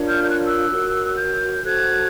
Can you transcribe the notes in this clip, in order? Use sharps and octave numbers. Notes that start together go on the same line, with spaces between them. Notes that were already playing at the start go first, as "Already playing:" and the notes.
Already playing: D4 F4 A#4 C#5
F6 G6
G6
F#6
F6
E6 F#6
F#4 A#4 C#5
F6 G6
F#4 A4 C5 F#6 G#6